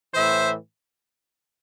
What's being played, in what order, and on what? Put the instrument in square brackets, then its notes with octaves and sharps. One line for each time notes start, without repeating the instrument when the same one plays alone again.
[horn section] A2 E3 C5 E5